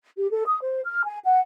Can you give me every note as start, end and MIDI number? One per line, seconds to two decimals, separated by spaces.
0.15 0.27 67
0.30 0.42 69
0.46 0.57 87
0.60 0.79 72
0.85 1.01 89
1.05 1.17 80
1.22 1.39 78